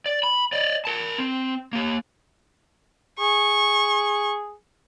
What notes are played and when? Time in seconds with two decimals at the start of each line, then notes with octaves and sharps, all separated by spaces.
0.06 D5
0.23 B5
0.52 D5 D#5
0.85 A#4 A5
1.18 C4
1.73 A#3 G4
3.20 G#4 C#6